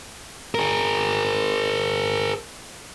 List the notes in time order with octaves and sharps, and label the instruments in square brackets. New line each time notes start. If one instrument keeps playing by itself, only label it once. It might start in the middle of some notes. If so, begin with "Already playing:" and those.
[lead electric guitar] G#4 A#4